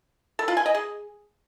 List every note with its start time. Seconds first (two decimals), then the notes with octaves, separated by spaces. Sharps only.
0.39 A4
0.48 F4
0.57 G#5
0.66 D#5
0.75 G#4